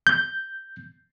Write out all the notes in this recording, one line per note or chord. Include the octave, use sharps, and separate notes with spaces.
G6